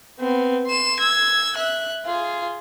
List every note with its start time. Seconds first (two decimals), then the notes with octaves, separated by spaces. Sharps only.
0.19 B3 C4
0.67 C6 E7
0.99 E6 G#6
1.56 E5 F#6
2.05 F4 G#4